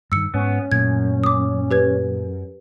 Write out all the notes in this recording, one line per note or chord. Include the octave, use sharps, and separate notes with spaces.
G2 D#3 E6 C#7
G#2 B3 C#4
F#2 A#2 A3 G#6
D6 D#6
G4 B4 G#6